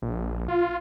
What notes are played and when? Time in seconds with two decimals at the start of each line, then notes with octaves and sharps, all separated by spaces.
0.02 A#1
0.48 F4